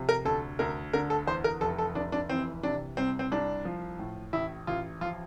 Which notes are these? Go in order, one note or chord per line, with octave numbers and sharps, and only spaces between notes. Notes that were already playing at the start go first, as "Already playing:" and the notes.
Already playing: C3 F3
A#4
D2 A4
D2 A#4
D3 A#4
A4
E2 C5
A#4
F1 A4
A4
F1 D4
D4
E3 C4
C3 D4
C2 C4
C4
C2 D4
F3
A2
A1 E4
A1 F4
F3 F4